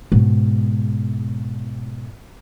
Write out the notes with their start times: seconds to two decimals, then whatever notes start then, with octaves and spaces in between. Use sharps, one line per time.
0.12 G#2 B2